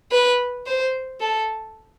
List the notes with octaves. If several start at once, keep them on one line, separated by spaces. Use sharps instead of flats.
B4
C5
A4